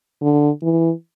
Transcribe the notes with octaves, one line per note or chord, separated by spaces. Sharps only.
D3
E3